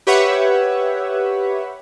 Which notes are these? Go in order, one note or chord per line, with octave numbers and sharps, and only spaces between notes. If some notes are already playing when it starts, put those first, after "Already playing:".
G4 B4 C#5 E5 F#5